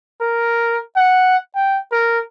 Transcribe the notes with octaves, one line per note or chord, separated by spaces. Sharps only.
A#4
F#5
G5
A#4